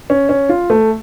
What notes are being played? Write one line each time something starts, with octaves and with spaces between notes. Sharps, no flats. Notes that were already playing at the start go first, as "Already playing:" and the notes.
C#4
C#4
F4
A3